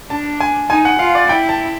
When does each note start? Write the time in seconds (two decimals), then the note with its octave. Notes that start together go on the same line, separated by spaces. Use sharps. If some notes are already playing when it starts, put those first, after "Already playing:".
0.10 D4 A5
0.40 G#5
0.70 D#4 G#5
0.85 F#5
0.99 F4 F5
1.15 D5
1.29 E4 G5
1.49 A5